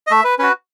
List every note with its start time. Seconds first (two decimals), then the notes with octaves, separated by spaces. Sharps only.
0.07 D#5
0.11 A3 E5
0.24 B4
0.39 C#4 F#4 B4